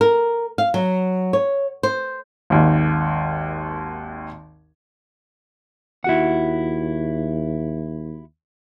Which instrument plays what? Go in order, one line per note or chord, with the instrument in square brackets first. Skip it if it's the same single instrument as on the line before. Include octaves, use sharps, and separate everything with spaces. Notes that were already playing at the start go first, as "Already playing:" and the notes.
[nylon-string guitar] A#4
F5
F#3
C#5
C5
[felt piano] G#1 D#2
[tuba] D#2 [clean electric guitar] E4 F#4 F#5